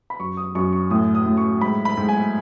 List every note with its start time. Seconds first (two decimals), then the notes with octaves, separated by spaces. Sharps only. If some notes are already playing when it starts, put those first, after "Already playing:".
0.10 B5
0.19 F#2 C#6
0.37 D#6
0.55 F#2 C#6
0.73 C#6
0.90 A2 D#6
1.15 D#6
1.26 A2
1.37 C#6
1.61 G#2 B5
1.85 B5
1.97 G#2
2.09 G#5